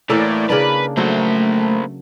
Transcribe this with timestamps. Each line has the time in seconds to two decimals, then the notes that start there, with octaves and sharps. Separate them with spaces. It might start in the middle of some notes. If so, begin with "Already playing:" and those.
0.10 A2 E3 A#3 A4 D5
0.50 C#3 A#3 D4 B4
0.97 F#3 A3 A#3 C5